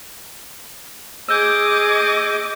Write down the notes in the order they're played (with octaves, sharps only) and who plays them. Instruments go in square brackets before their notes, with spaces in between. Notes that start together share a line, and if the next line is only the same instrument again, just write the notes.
[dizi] G#4 [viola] D#5 D6 [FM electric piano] E6 G6